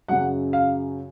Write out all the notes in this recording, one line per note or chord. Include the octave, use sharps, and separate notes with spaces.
F#2 C#3 F#3 F#5
F5